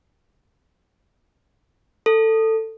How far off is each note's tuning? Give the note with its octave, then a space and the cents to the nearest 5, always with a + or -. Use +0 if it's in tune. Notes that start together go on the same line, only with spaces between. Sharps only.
A4 +15